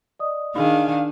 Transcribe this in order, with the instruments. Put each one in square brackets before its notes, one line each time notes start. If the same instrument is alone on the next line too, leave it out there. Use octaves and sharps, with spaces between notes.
[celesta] D5 D#5 D#6
[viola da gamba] D#3 D4 [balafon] D#4 G#4 [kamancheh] F5 G#5